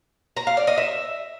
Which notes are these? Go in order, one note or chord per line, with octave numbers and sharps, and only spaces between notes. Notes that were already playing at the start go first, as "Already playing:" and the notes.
A#5
F5
D5
D#5
E5